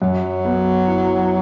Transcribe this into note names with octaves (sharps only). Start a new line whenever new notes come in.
F#2 F#3
B3
E4